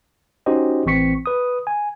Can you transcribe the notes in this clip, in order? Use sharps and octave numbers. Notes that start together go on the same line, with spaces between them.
C#4 D#4 F#4 G4 C5 D#5
A1 E3 C4 C#6 B6 C#7
B4 D#6
G#5